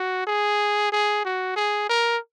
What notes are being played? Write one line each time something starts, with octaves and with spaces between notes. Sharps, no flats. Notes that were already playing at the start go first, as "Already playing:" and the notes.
Already playing: F#4
G#4
G#4
F#4
G#4
A#4